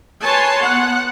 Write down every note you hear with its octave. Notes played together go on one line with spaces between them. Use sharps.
B4 C#5 G#5 A5 C6
B3 F#5